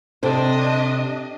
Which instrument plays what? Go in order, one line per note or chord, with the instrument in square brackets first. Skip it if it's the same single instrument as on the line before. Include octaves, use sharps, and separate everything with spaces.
[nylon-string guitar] C3 A4 C5 [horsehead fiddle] D4 D#5